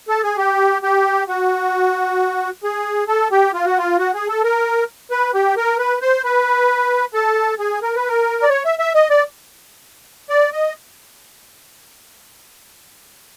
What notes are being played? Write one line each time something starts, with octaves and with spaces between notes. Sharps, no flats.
A4
G#4
G4
G4
F#4
G#4
A4
G4
F4
F#4
F4
F#4
G#4
A4
A#4
B4
G4
A#4
B4
C5
B4
A4
G#4
A#4
B4
A#4
D5
C#5
E5
E5
D#5
D5
D5
D#5